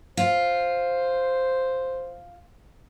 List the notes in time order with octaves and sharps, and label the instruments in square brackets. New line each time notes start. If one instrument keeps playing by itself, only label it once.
[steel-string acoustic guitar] F4 [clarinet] C5